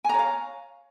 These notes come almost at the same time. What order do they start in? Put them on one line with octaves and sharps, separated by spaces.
G#5 A#5 C#5 F5